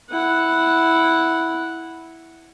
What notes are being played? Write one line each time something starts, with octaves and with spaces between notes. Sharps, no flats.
E4 F#5